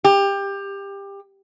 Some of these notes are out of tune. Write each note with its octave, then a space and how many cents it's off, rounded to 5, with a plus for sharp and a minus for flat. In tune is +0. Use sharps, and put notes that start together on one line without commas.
G4 +20